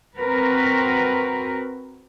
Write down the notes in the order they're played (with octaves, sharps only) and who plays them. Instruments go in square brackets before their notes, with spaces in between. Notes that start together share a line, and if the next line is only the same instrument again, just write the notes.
[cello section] C4 F#4 A#4 B4